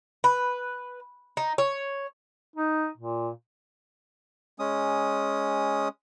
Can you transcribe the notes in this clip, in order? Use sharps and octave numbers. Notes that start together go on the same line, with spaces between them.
B4
D#4
C#5
D#4
A#2
G#3 C#4 D#6